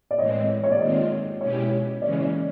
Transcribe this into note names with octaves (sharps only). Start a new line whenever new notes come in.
D5
A2 E3 G#3 C4 C#5 D#5
C#5
D5
D#3 G#3 C4 F4 C#5 D#5
B2 G#3 C#4 E4 G4 C#5
C#3 E3 G#3 C#4 D5
D5